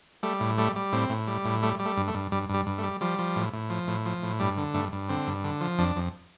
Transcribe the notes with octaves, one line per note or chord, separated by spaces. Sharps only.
G3 A3
A2
G3 A3
G3
A2 C4
A2
G3
A2
G3 A3
G3
A3
G2
A3
G2
G2 G3
G2 G3
G2
A3
G3
F3 G3
F3
A2
A2
F3
A2
F3
A2
G2 G3
D3
G2 A3
G2
D3 C4
G2
D3
F3
F2 D4
F2